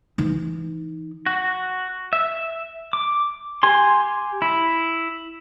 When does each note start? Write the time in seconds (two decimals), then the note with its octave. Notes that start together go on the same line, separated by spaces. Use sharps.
0.18 E3 D#4
1.26 F#4
2.13 E5
2.93 D6
3.63 G4 G#5 C6
4.42 E4